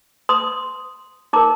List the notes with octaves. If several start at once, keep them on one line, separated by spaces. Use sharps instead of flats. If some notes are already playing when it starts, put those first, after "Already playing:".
C6 D#6
D#4 A#4 A#5 D6